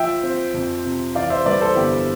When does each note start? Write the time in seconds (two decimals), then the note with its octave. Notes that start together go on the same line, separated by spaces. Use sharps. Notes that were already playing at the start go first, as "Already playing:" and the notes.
Already playing: F3 E5 G5
0.23 C4
0.54 F2
0.85 C3
1.15 E3 D5 F5
1.30 C5 E5
1.46 G3 B4 D5
1.60 A4 C5
1.75 G1 E4 G4